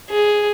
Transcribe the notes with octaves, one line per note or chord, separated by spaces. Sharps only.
G#4